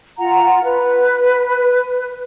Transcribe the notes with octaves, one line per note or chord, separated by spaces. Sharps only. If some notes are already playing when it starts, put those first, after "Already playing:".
F4 F#5 A#5
B4